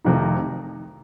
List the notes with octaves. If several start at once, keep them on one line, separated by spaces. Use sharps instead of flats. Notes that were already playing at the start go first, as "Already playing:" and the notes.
F1 F2 C3 D#3 D#4